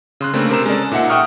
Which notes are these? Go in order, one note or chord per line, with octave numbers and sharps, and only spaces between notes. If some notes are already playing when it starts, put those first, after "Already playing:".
C#3 C6 F#6
C#3 A3 A#3 C4 D4
C3 A#4 C5 A#5 E7
G#3 C#4 A4 D5
A#2 D#4 E5 F#5 C#7
E5 F#5 G5 C#6 D#6 F6